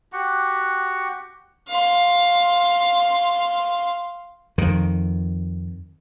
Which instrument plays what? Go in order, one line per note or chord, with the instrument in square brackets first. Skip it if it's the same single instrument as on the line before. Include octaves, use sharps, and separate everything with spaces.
[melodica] F#4 G4 F#5
[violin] F5 C6
[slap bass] F2 D#3